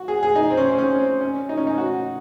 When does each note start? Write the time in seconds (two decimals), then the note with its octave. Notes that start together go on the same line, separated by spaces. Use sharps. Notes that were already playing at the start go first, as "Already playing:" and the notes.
Already playing: F#4
0.08 G#4
0.23 G#4
0.36 D#4
0.51 C4
0.57 C#4
0.69 C4
0.78 C#4
0.99 C4
1.21 C#4
1.49 D#4
1.57 C#4
1.67 D#4
1.78 F#4